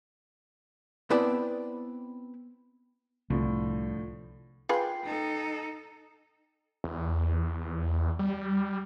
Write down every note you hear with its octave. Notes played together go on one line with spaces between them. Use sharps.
B3 C4 E4 B4 D5 A5
C2 A2 D3 F3
F4 G#4 B4 G5 C6
D#4 A4
E2
G3